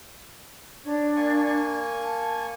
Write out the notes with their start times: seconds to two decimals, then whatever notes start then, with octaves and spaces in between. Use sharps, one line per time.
0.85 D4 C#5
1.16 A#3 G#5 C#6
2.03 A5